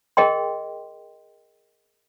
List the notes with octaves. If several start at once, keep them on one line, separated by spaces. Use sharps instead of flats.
G#4 A#4 D#5 G5 C6